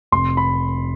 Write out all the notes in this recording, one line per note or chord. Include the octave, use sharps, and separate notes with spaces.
F1 C6
B5